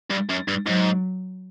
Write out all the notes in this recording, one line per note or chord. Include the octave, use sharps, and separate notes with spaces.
G2
F#2
G2
G#2 F#3